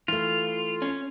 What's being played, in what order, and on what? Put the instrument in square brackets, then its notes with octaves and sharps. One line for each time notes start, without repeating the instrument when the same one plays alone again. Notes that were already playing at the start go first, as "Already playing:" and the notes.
[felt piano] E3 A3 [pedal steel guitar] F4
[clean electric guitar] C#4